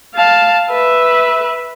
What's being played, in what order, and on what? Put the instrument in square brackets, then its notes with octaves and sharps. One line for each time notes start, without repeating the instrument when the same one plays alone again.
[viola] F5 A5
B4 E5